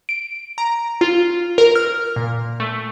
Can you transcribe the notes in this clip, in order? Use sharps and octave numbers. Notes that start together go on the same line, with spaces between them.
D7
A#5
F4
A#4
F6
A#2
A3